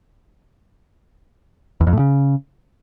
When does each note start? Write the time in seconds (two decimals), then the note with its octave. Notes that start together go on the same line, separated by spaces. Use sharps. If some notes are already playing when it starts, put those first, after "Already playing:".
1.81 E2
1.87 F2
1.93 A2
1.99 C#3